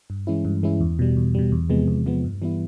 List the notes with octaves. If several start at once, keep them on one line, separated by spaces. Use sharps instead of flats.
G2
E3 G#3 C#4 E4
G2
E3 G#3 C#4 E4
E2
B2 G3
E2
B2 G3
E2
C3 F3 G#3 B3
E2
C3 F3 G#3 B3
G2
E3 G3 B3 E4